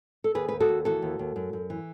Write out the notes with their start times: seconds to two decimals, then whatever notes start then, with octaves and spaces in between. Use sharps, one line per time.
0.24 A4
0.35 D#2 G#4 B4
0.48 D#2 B4
0.60 F#4 A4
0.68 D#2
0.85 E3 F#4 A4
1.02 D#2
1.19 D#2
1.36 F#2
1.53 F#2
1.70 E3